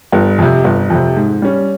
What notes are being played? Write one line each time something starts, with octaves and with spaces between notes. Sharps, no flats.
G1
F2 C3
G1
F2 C3
G#2
G3 C#4